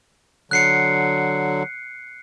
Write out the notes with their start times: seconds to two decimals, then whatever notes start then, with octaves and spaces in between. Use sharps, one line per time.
0.51 D3 F#3 F#6 C7 C#7